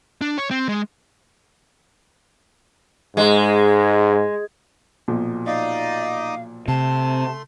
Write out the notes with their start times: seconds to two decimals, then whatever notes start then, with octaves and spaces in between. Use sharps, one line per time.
0.21 D4
0.38 C#5
0.50 C4
0.69 G#3
3.17 G#2 G#3
5.08 B1 A#2 F3
5.46 D#4 D5 D#5 F5
6.68 C3 A3 A5 C6